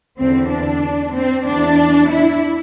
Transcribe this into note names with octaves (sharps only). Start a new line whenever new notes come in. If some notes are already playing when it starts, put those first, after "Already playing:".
E2 D3 C4
D4
C4
E2 E3 D4
E4